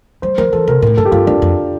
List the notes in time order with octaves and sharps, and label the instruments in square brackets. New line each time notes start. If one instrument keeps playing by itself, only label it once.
[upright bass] G3 [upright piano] C5
[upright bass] F3 [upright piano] A#4
[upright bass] E3 [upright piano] A4
[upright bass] C3 [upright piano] A#4
[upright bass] A2 [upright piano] A#4
[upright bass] G2 [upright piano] A4
[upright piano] G4
[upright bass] G2 [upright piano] F4
[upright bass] F2 [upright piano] D4
[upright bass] F2